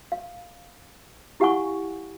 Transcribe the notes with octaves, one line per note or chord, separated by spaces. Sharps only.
F5
E4 G4 F5 F#5 G#5 C#6